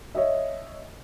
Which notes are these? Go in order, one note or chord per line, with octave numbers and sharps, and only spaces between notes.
C#5 D#5 E5